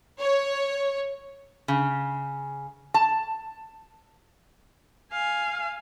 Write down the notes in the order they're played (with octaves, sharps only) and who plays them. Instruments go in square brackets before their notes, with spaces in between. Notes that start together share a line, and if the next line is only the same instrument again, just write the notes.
[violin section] C#5
[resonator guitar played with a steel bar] C#3
A5
[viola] F5 G#5